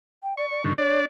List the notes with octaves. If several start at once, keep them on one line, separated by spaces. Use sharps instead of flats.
G5
D5 C#6
D5
G2 D3 D#3 C#6
D4 C#5 D5